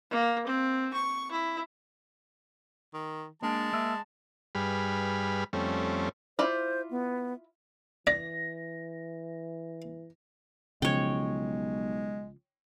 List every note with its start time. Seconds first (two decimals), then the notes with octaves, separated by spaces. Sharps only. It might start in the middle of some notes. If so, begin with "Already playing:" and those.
0.11 A#3
0.46 C4
0.93 C#6
1.31 E4
2.94 D#3
3.42 G#3 A#3 D4 A5
3.73 A#3 E5
4.55 G2 G3 G#4 B4 B5 F6
5.53 F2 G3 A3 C4 C#4
6.39 E4 F4 C5 D5
6.90 B3
8.07 E3 D5 A#6
10.82 B1 C#3 F3 G#3 C#5 G5